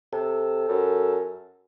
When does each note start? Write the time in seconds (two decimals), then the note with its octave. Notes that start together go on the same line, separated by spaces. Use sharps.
0.13 C3 A4
0.69 F#2